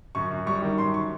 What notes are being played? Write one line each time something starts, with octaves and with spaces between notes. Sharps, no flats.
F#2 C#6
F#2
G3 C#6
D#3
F#2 C6
C#6